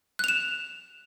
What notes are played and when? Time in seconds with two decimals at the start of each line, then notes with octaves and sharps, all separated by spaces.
0.19 F#6
0.24 F7
0.28 E7